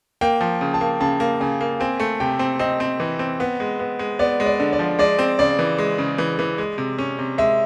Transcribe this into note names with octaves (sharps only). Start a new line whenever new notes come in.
A#3 G5
F3
C#3
A5
A#3
C#3 A5
A#3
C#3 G#5
A#3
C4 G#5
A3
C3 G5
C4
C4 D#5
C4
E3
C4
B3
G#3
B3
G#3
B3 D5
G#3
D5
D3
D5
F3
G#3 D5
C4
C#3 D5
E3
G#3
C#3
E3
E3
G#3
C3
C#4
C3
G#3 E5